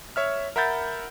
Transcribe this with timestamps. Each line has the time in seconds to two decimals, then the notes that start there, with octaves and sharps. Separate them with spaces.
0.16 C#5 E5 F6
0.56 A#4 E5 F#5 B5 G6 A6